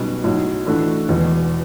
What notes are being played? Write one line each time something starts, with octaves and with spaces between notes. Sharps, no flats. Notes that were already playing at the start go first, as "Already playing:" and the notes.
Already playing: B1 B2 G3 C#4 F#4
B1 A2 F#3
A2 E3 A3 D4 F#4
E1 E2 B2